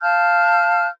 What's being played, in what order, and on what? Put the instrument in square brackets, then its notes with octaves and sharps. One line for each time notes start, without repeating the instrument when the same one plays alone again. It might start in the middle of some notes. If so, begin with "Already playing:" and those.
[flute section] F5 A5 F6 G6